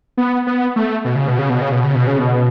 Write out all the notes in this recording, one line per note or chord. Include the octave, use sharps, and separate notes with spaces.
B3
B3
A3
B2
C#3
B2
C#3
B2
C#3
B2
C#3
B2
C#3
B2